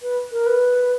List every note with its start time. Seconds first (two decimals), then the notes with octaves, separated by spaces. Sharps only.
0.02 B4
0.32 A#4
0.46 B4